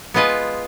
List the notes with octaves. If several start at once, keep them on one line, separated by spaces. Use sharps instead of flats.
G#3 B3 F4 B4 D#5